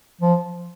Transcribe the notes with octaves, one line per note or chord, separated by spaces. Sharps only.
F3